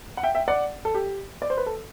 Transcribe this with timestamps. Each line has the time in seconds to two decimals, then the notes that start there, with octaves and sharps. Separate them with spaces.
0.17 F#5
0.23 E5 G5
0.35 E5 G5
0.48 D5 F#5
0.85 A4
0.95 G4
1.42 D5
1.50 C5
1.57 B4
1.66 A4